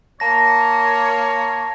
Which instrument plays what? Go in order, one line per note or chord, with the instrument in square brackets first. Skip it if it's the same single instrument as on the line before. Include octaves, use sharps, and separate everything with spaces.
[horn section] A#3 C#5 [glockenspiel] A5 A#6